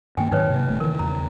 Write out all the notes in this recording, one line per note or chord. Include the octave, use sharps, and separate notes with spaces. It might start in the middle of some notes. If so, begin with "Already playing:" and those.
G2 D#3 A#3 G5 G#5
G#2 D#3 F#3 D#4 B4 C#5
C3 A#3
D#1 D#2 A3
D#3 E3 A#4
E2 C#3 A#5